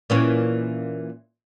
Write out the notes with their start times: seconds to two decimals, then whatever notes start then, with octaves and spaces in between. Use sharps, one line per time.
0.10 A#2 E3 C#4